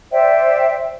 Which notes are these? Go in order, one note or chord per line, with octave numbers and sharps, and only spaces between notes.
C5 D5 E5 G5